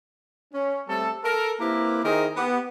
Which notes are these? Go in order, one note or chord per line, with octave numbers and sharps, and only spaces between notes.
C#4
G3 A3 C4 A4
A4 A#4
A#3 C4 E4 G4 A#4 B4
D#3 E4 G#4 A#4 C5 D#5
B3 G4